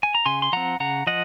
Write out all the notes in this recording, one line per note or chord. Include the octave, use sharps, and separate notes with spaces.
G#5
A#5
C#3 G#5 C6
C6
F3 C4 F#5 A#5
C#3 F#5 A#5
F3 D#5 F#5